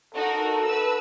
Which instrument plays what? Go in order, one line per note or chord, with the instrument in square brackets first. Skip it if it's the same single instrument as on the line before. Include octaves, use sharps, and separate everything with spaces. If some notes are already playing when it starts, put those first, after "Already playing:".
[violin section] D#4 F#4 A#4 [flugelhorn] A4
[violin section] B4 E6